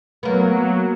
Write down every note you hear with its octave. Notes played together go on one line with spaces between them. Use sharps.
F#3 A#3 B3